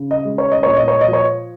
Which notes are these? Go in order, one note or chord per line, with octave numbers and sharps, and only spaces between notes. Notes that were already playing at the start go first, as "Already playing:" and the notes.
Already playing: C#3
D#5
G#3
C#5
D#5
A#2 C#5
D#5
C#5
D#5
F3
C#5